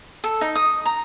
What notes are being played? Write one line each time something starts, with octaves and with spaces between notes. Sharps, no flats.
A4
D#4
D#6
A#5